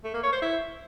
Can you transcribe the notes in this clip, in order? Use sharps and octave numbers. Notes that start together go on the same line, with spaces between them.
A3
A#3
C#5
C5
E4